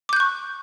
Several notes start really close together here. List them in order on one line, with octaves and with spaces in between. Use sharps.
D6 G6 F#6 C#6